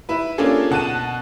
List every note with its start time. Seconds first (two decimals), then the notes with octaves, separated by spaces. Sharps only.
0.09 E4 B4
0.38 A#3 C#4 D4 F4 G#4 A4
0.71 B2 F#5 A5 F#6 D#7